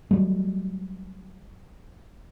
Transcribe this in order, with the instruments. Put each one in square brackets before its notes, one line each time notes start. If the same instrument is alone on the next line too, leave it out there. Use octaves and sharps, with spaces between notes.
[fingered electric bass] F#3 G3 A3